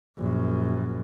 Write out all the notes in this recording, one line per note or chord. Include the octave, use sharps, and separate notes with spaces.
A#1 F#2